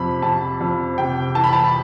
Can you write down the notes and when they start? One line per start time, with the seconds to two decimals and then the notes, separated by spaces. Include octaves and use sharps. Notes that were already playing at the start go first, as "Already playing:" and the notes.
Already playing: F2 C3 B5
0.22 F2 A5
0.61 F2
0.98 C3 G5
1.35 E3 A5
1.44 B5
1.53 A5